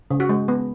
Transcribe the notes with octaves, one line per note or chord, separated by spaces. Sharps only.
C#3
F#4
G#3
B3